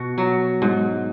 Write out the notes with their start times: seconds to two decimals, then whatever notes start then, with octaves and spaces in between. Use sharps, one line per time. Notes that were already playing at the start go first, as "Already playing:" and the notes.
Already playing: B2 F#4
0.18 F#3
0.62 G#2